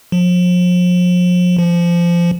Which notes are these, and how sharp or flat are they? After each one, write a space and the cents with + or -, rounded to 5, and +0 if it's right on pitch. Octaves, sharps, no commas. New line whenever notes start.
F3 +40
F3 -20